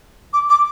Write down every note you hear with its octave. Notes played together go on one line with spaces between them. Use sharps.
D6
D6